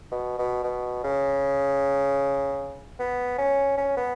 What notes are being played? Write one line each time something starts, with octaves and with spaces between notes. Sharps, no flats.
B2
B2
B2
C#3
B3
C#4
C#4
B3